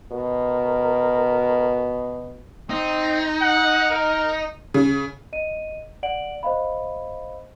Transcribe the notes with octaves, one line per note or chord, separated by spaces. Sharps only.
B2 A#4
C4 D#4
F#5
A#4
C#3
D#5 D#7
D5 F#5 D7 F#7
C5 D#5 F5 B5